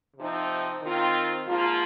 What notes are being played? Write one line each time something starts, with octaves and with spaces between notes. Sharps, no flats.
C3 F3 C4 D#4
D#3 C4 F4
G#2 F3 A#3 F4